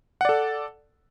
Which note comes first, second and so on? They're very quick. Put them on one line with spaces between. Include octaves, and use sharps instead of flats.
F#5 D5 A4